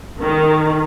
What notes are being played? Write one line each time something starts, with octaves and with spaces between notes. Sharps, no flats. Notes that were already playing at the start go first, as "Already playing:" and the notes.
D#3